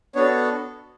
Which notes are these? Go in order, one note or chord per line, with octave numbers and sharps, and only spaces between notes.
B3 D4 F#4 A4 C#5